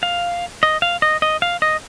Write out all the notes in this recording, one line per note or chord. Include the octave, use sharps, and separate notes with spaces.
F5
D#5
F5
D#5
D#5
F5
D#5